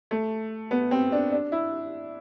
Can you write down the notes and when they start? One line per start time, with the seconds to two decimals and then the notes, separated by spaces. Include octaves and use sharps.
0.11 A3
0.71 B3
0.91 C4
1.12 D4
1.32 D4
1.52 E4